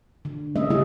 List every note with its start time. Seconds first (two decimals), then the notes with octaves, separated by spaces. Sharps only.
0.25 D3
0.56 G#3 A#3 C#4 D#5 E5
0.70 C#3 G3 A3 E4 G#4 D#5